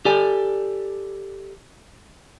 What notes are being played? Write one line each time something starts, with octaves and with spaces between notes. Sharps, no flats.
G4 A4 D5 G#5